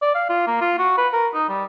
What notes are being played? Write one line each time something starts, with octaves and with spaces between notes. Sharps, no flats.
D5
F5
F4
A#3
F4
F#4
B4
A#4
D#4
G3